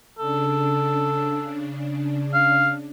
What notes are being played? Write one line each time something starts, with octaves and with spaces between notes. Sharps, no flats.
C#3 D4 A4
F5